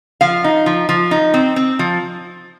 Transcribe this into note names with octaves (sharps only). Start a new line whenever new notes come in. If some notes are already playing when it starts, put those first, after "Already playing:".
F3 F5
D#4
F3
F3
D#4
C4
C4
F3